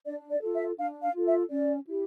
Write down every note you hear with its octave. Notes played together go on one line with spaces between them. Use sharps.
D4 D5
D5
F4 A4
E5
D4 F5
F5
F4 A4
E5
C#4 D5
E4 G4